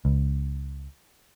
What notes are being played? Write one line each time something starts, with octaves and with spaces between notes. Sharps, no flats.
C#2